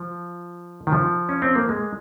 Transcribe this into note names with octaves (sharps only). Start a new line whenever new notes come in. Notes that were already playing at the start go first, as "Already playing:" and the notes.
Already playing: F3
D#3
F3
C#4
C4
A#3
G#3